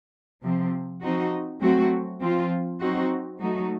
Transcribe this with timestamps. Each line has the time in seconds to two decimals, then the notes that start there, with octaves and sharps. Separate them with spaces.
0.43 C3 F3 C4
1.02 F3 C4 D#4 F#4
1.62 F#3 A3 C4 F#4
2.21 F3 C4 F4
2.80 F#3 C4 D#4 F#4
3.40 F#3 A3 D#4 F#4